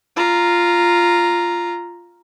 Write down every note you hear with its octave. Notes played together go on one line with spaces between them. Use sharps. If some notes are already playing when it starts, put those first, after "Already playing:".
F4 A#5